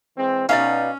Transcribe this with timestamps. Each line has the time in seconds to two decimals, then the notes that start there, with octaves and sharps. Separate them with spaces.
0.17 E3 G#3 C4
0.49 B2 C#4 D#4 D5 E5 F5